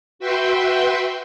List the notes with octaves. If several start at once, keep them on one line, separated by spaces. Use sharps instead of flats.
F#4 B4 E5 G5 C6